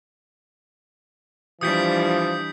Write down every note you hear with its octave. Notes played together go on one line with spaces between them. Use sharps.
E3 F3 G3 D4 D#6 G6 B6